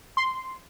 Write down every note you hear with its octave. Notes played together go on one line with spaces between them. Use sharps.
C6